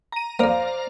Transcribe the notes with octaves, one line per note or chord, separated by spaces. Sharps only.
A#5 D#7
F2 A#3 C5 D5 F5 A#5